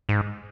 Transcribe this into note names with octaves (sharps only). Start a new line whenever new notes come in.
G#2